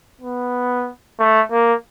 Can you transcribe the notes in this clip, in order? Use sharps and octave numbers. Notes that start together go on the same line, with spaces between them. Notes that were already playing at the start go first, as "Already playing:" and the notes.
B3
A3
A#3